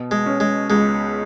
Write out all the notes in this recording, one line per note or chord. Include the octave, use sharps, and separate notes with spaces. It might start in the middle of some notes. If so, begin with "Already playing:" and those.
Already playing: B2
G#3
C#4
G#3
C#2 G#3